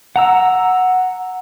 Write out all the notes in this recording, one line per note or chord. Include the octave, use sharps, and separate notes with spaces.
F#5 A#5 E6